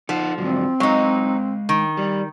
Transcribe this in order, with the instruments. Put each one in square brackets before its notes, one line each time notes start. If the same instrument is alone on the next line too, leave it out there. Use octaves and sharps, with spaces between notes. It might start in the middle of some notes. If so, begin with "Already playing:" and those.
[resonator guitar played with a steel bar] F3 [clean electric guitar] D#4 A4 F#5
[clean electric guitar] G#2 D3 F#3 [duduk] C4
[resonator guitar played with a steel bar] F#3 D#4 [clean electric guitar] G#3 C#5 F5
[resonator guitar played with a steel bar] D#3
[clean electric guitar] G3